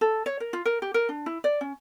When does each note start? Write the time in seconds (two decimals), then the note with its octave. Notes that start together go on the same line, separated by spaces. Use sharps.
0.01 A4
0.26 C#5
0.40 A#4
0.53 F4
0.65 A#4
0.82 G4
0.94 A#4
1.09 D4
1.26 E4
1.44 D5
1.61 C#4